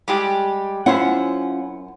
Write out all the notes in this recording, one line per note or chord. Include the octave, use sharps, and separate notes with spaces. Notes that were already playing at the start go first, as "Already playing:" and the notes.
G3 G#3 G4
F#2 C#4 E4 F4 C5 F#5